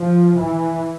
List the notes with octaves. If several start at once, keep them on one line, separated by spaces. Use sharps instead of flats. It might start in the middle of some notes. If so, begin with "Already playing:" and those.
Already playing: F3
E3